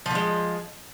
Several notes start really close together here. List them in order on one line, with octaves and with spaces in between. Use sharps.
F3 D3 G#3